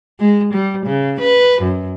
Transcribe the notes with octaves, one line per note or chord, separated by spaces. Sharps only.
G#3
G3
C#3
B4
F#2